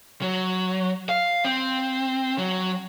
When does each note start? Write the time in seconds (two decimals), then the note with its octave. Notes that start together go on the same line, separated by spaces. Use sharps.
0.22 F#3
1.09 F5
1.45 C4
2.38 F#3